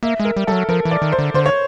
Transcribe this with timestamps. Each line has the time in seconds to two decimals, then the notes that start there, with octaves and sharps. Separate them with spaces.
0.03 A#3 E5
0.20 G#3
0.25 A#4
0.37 G3
0.47 G3 A4
0.52 F#3
0.69 F3 A#4
0.85 E3
0.91 D5
1.02 D#3
1.12 C5
1.19 D3
1.34 D3 C5
1.46 C#5